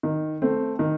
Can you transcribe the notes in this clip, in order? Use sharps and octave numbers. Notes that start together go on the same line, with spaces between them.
D#3
A3 C4
D#3